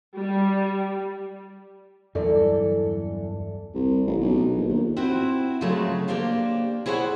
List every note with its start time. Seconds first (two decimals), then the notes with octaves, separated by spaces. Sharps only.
0.18 G3
2.15 E2 G2 E3 F#3 A4 D5
3.75 C2
4.07 A1
4.21 B1
4.57 A#1
4.69 D#2
4.97 C4 E4 F#4 C5
5.61 C#3 F3 F#3 G#3 A3 A5
6.08 A#3 D4 G4 C5 F5
6.86 E4 G#4 C5 C#5 D#5 F#5